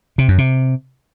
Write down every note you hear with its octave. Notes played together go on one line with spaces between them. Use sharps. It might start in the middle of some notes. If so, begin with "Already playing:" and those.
C3
F#2
C3